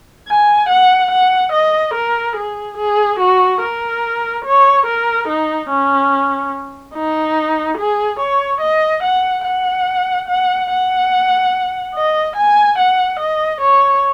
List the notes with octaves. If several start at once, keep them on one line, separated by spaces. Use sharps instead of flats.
G#5
F#5
F#5
D#5
A#4
G#4
G#4
F#4
A#4
C#5
A#4
D#4
C#4
D#4
G#4
C#5
D#5
F#5
F#5
F#5
F#5
D#5
G#5
F#5
D#5
C#5